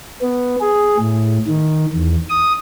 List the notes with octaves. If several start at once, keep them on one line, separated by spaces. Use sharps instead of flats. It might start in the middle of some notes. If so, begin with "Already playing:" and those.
B3
G#4
A2
D#3
E2
D#6